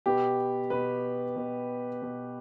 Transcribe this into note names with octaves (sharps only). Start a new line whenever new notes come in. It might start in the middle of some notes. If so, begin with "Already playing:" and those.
B2 B3 G4
B2 B3 B4
B2 B3
B2 B3